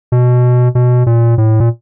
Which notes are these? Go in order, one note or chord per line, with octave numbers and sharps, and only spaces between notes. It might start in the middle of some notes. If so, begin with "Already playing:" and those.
B2
B2
A#2
A2
A#2